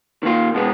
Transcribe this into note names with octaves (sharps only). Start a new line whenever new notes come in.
D#3 A#3 F4
B2 G#3 B3